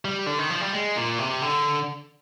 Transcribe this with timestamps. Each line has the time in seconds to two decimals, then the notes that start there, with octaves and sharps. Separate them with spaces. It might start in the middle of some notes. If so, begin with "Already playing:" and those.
0.05 G3
0.26 D3
0.38 D#3
0.50 F3
0.61 G3
0.73 G#3
0.96 A#2
1.19 C3
1.42 D3